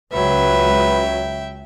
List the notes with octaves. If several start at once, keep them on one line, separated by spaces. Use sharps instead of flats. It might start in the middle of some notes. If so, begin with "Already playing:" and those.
C#2 F#3 B4 E5 G5